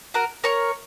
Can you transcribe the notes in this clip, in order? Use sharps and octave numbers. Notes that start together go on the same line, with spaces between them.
F#4 A#4
A#4 C#5